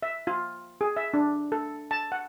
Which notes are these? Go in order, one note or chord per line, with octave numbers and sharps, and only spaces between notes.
E5
F4
G#4
E5
D4
A4
A5
F#5